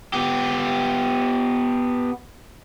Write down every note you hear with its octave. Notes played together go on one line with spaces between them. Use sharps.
B3 G4